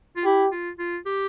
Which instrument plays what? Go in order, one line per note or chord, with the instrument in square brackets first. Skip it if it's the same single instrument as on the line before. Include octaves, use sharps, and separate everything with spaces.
[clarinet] F4
[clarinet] E4 [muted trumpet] G4
[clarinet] F4
F4
G4